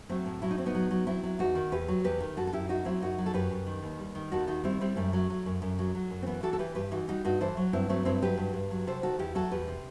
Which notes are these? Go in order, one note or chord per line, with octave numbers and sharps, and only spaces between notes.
F#3 A3 C4
A2
F#3 E4
D#4
A2 C4
B3 D#4
F#3
F#3
F#3 C4 E4
F#3
E2 D#4 F#4
D#3
E2 G4 B4
F#3
E2 G4 B4
D#3
F#2 F#4 A4
A4
F#2 E4 G4
F#3 D#4 F#4
F#3 C4 E4
F#2 D#4 F#4
F#3
A4
F#2 G4 B4
F#2
D#3
D#2
G3
D#3
D#2 F#4 A4
D#3 D#4 F#4
G3 C4 E4
G3 C4 E4
F#2 A3
F#3
F#3
F#2
F#2
F#3
F#3
F#2
C4
E3 B3
E3 F#4 A4
A4
E3 G4 B4
G2 G4 B4
E3 D#4 F#4
G3 D#4 F#4
G2 D#4 F#4
E3 A4 C5
F#3
G2 C4 E4
F#3 A3 C4
G2 C4 E4
F#3 G4 B4
G2
G2
F#3
C3 A4 C5
D#3 F#4 A4
E2 E4 G4
F#3 F#4 A4
E2 G4 B4
C3